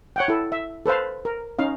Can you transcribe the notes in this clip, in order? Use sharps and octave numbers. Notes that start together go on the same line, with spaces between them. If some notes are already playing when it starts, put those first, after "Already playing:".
C#5 F#5 G5
E4 A4
E5
A4 B4 C5 F5
A#4
C#4 D#4 F5